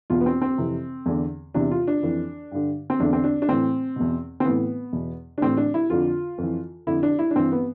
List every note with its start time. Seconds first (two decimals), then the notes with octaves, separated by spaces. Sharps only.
0.10 E2 B2 F4
0.21 B3
0.26 C4
0.42 C4
0.58 F2 C3 E3
1.06 E2 D3
1.54 E2 C3 E3 D4
1.71 F4
1.87 D4
2.03 F2 E3
2.52 G2 D3
2.90 C4
3.00 E2 D3 D4
3.13 C4
3.24 D4
3.42 D4
3.48 A2 E3 C4
3.96 E2 B2
4.40 C4
4.45 A2 E3 B3
4.93 E2 B2
5.38 D4
5.41 A2 E3 C4
5.57 D4
5.74 E4
5.90 F2 D3 F4
6.38 F2 E3
6.87 F2 D3 E4
7.03 D4
7.19 E4
7.31 D4
7.35 G2 E3 C4
7.52 B3